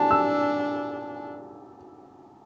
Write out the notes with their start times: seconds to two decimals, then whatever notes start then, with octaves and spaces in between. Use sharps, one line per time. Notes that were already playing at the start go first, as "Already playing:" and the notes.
Already playing: D4 G#5 A5
0.11 E6